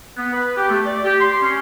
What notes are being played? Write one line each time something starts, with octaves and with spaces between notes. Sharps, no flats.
B3
B4
G4
A3
D5
G4
C6
C#4